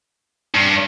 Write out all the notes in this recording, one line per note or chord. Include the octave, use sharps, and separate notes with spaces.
G2